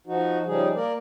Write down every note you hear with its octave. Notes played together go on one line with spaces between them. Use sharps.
F3 D#4 F#4
C#3 F3 G3 D#4 G#4
A#3 A#4 D5